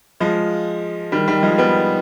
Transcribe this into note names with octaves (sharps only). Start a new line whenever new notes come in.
F3 G#3
D#3 G3
D#3 G3
F3 G#3
G3 B3